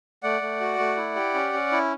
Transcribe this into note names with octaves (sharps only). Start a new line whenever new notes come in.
A3 D5 F#5
A3
F#4
A3
E4
G4
C#4
C#4
E4